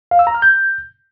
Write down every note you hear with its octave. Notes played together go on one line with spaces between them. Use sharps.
F5
E6
A#5
F6
G6